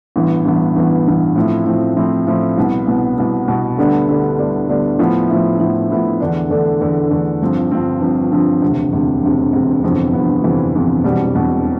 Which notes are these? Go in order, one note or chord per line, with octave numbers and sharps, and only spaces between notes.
A1 G2 E3 B3
A1 G2 E3 B3
A1 G2 E3 B3
A1 G2 E3 B3
A2 F3 C4 E4
A2 F3 C4 E4
A2 F3 C4 E4
A2 F3 C4 E4
C2 B2 B3
C2 B2 B3
C2 B2 B3
C2 B2 B3
D2 D3 G3 B3 D4
D2 D3 G3 B3 D4
D2 D3 G3 B3 D4
D2 D3 G3 B3 D4
A2 F3 B3 E4
A2 F3 B3 E4
A2 F3 B3 E4
A2 F3 B3 E4
E2 D3 A3 D4
E2 D3 A3 D4
E2 D3 A3 D4
E2 D3 A3 D4
G1 G2 F3 C4
G1 G2 F3 C4
G1 G2 F3 C4
G1 G2 F3 C4
E1 D2 C3
E1 D2 C3
E1 D2 C3
E1 D2 C3
G1 F2 C3 E3 B3
G1 F2 C3 E3 B3
G1 F2 C3 E3 B3
G1 F2 C3 E3 B3
E1 E2 B2 G3 C4
E1 E2 B2 G3 C4